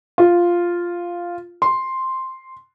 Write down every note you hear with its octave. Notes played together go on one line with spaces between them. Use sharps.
F4
C6